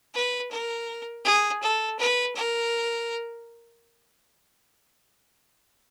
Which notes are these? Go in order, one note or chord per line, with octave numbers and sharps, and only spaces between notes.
B4
A#4
G#4
A4
B4
A#4